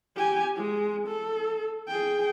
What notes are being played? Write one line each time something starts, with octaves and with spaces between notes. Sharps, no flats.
G4 G#5
G#3
A4
G#4 G5